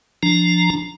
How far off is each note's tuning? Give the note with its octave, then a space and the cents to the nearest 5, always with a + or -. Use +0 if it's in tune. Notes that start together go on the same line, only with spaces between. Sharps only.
F3 +0 D4 +0 A#5 +0